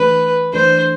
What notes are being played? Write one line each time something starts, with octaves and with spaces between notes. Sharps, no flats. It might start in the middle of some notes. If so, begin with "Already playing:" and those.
Already playing: E3 A3 D4 A4 B4
E3 A3 D4 A4 C5